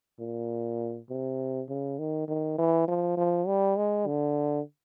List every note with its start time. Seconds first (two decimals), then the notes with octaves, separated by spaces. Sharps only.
0.19 A#2
1.10 C3
1.69 C#3
1.99 D#3
2.28 D#3
2.58 E3
2.88 F3
3.17 F3
3.47 G3
3.77 G#3
4.07 D3